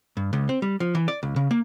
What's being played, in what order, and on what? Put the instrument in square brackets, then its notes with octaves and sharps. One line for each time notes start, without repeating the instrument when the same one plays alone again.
[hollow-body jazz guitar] G2
C#2
C4
G3
F3
E3
D5
C#2
C#3
A#3